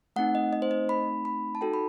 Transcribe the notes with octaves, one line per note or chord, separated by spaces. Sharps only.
A3 C4 D#4 F#5
D#5
D#5
C5
D#5
B5
B5
A5
D#4 F#4 A4 G5
B5